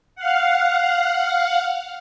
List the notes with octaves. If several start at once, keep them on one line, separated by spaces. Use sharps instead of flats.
F5 F#5